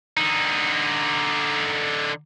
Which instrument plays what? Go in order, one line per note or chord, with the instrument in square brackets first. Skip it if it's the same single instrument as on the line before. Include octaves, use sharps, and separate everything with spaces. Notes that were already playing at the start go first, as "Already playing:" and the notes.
[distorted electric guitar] D3 D#4